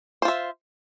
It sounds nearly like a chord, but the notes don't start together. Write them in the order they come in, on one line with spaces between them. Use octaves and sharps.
C5 F4 E5